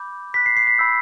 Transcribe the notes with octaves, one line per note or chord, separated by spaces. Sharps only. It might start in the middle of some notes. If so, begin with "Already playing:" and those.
Already playing: B5 D6 G6
B5 F#6 B6
C7
C7
B6
B5 E6 G6